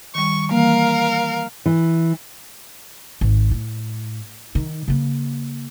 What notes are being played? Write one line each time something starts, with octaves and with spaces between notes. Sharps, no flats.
D#3 G3 C#6
E3 G3 A#3 A#4 F5
E3
G#1
A2
D#3 D#4
C#3 A#3